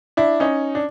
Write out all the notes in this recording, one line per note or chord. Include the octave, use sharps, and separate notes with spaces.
D4 E4
C#4 D#4
D4